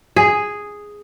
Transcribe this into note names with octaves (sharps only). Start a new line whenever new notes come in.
G#4